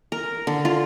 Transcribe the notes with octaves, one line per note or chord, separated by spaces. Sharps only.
A#4
D3
F4